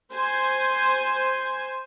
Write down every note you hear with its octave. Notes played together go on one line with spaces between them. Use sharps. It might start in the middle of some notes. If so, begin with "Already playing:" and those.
C5 G#5